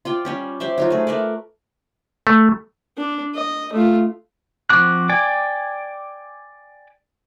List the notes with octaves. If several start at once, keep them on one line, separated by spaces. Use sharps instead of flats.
F4 D5 G5
G3 C#4 G4
G4 C5 D5 E5
F#3 D#4 F4
A3 G#4
A3 A#4 B4 D5
A3
D4
D#5
A3 F4
F3 C4 F#4 D6 F#6
D5 G5 G#5 D6